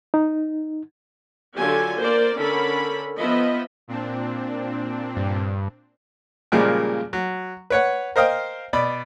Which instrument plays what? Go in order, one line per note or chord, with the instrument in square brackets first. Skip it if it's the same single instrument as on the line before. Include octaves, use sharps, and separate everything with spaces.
[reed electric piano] D#4
[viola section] D3 F#3 F4 G4 A4 G#5
A#3 A#4 C5 D5
D3 C#4 A4 A#4 B5
F3 B3 D#5 E5 B5
[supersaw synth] A#2 C4 D4
[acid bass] G2
[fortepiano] A#2 C#3 F3 G3 G#3 A#3
F#3
B4 C#5 F#5
A#4 C5 D#5 F5 G5
B2 D5 B5